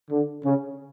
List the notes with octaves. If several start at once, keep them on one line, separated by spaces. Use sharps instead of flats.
D3
C#3